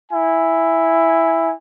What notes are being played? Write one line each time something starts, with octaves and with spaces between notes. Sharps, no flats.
E4 G#5